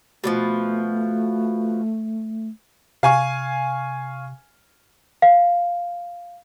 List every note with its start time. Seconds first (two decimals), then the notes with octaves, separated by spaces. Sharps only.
0.24 B2 D3 F3 A3
3.03 C3 F5 G#5 C#6
5.22 F5